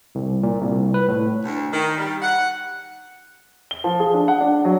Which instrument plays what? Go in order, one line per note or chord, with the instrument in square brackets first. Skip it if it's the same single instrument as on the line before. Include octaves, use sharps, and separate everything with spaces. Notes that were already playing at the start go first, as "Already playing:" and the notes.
[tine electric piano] C2
A#2
C2
B4
A2
[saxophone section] D2
D#3
G3
F#5
[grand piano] G7
F3
G#4
D4
F#5
D4
F#3